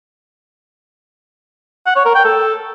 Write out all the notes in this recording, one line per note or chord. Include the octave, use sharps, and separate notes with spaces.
F#5
C#5
A#4
G5
A4